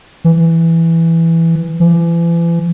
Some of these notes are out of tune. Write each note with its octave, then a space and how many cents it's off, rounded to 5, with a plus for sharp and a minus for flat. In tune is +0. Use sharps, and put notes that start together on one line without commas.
E3 +5
E3 +40